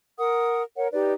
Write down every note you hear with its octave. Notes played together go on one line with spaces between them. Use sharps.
A#4 F#5 D#6
A#4 C#5 F#5
D#4 G4 B4 D5